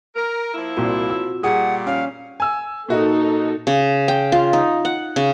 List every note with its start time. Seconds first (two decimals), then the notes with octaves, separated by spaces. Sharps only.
0.16 A#4
0.54 F3 A#3 E4
0.77 C2 A#2 C4 F4 F#4
1.10 E6
1.43 A#2 G3 G#4 F#5 C#6
1.86 C#4 F5
2.40 G#5 E6
2.89 A#2 D#4 F#4 A4 D#5
3.67 C#3
4.08 G5
4.32 F4
4.53 D#4
4.85 F#5
5.16 C#3